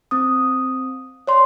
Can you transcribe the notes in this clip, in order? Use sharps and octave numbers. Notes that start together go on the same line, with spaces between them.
C4 D#6
C#5 D5 C6